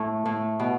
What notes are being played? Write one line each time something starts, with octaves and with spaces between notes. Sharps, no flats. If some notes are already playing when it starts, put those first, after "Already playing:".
Already playing: A2
A2
B2